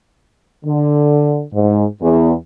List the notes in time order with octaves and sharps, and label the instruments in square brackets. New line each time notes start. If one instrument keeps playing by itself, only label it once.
[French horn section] D3
G#2
E2